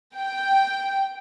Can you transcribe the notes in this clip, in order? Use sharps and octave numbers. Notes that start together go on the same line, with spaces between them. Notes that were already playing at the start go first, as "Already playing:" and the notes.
G5